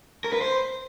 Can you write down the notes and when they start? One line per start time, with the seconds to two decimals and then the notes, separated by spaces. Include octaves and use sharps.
0.24 A#4
0.33 B4
0.41 C5